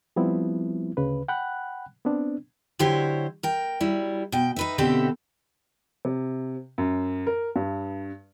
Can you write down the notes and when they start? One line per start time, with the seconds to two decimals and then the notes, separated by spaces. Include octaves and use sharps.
0.16 F3 G3 B3 C4 E4
0.97 D2 C#3 B4
1.28 F#5 G5 B5 F#6
2.05 B3 C4 D4
2.79 D3 F#3 E4 G4 C5 C#5
3.43 A#4 G5
3.80 F#3 G3 E4
4.32 B2 G5
4.56 D#4 B4 E5
4.78 B2 D3 C4 G4 A4 E5
6.05 C3
6.78 F#2
7.27 A#4
7.56 G2